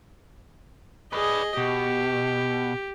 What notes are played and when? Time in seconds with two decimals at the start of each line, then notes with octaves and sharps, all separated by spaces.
1.13 G#4 B4 D5 D#5
1.57 B2 G4